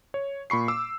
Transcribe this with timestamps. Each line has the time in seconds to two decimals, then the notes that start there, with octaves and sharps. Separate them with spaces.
0.14 C#5
0.50 A#2 B5 C#6 C7
0.68 D6 E6